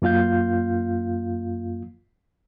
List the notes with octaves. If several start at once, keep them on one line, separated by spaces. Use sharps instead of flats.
F#2 A#3 F4 F5 G6